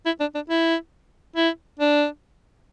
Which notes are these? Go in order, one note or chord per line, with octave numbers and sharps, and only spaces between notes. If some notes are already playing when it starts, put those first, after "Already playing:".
E4
D4
D4
E4
E4
D4